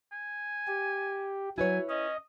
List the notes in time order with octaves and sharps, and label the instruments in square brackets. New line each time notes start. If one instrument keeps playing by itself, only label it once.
[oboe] G#5
[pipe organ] G4
[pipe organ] F#3 [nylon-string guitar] E4 B4 C#5 [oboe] G#5
[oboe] C#4 [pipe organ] D#5